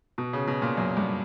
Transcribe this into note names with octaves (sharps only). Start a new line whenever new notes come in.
B2
C#3
B2
A#2
F#2
G2